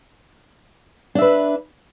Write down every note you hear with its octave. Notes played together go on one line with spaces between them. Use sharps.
D4 B4 E5